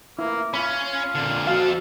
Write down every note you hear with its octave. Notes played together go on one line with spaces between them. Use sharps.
A#3 E4
C#4 F4 B5
A#2 D3
F3 F#4 A4 F5